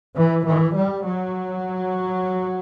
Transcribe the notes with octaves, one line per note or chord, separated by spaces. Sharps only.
E3
E3
G3
F#3